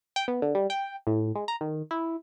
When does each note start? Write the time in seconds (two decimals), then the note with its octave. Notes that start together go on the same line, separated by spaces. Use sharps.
0.16 G5
0.28 B3
0.42 D3
0.55 G3
0.70 G5
1.07 A2
1.35 G#3
1.48 A#5
1.61 D#3
1.91 E4